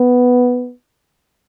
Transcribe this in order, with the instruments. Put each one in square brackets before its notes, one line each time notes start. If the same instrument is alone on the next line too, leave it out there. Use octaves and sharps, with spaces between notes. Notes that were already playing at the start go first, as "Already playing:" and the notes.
Already playing: [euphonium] B3